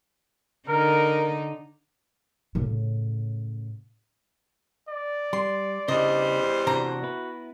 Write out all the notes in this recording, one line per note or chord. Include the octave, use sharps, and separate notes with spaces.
D3 D#4 A#4
A2 C#3
D5
G3 C6
E2 C#3 G3 D4 C5 D#5
C3 E3 D4 F#4 A#5
B3 E4 B4